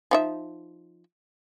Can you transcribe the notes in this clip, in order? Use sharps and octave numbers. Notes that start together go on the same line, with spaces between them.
F3 D#4 E5